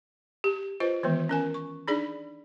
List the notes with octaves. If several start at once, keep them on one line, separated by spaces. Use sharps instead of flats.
G4
F4 B4 C5 D#5
D#3 E3 G#3 B3
C#4 A#4 G#5
C#6
D4 D#4 G#4 D5 B5